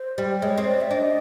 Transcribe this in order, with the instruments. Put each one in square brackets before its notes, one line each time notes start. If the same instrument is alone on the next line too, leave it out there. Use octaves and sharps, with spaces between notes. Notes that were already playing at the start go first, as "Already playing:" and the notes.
Already playing: [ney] C5
[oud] G3
[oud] G#3 [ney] C#5
[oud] C4
[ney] D5
E5
[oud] D4 [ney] D#5